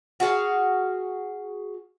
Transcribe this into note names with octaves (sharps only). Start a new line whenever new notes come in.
F#4 G#4 F5